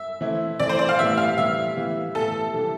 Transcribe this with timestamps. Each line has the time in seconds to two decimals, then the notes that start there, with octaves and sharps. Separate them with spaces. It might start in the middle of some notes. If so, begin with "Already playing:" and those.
Already playing: E5
0.21 E3 A3 C4 E4
0.60 E3 A3 C4 E4 D5
0.69 C5
0.79 D5
0.89 F5
0.98 A2 E3 G3 B3 E5
1.18 F5
1.37 A2 E3 G3 B3 E5
1.76 A2 E3 G3 B3
2.15 A2 E3 G3 B3 A4
2.53 C3 E3 G3 D4